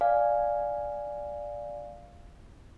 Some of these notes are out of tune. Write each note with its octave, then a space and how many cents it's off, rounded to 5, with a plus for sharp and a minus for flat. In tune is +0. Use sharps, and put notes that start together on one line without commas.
D5 +0 F5 +0 G#5 +0